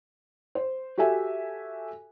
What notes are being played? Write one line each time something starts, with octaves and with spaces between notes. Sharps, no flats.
C5
F#4 G4 A4 E5 G#5